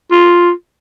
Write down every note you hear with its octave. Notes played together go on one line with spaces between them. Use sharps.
F4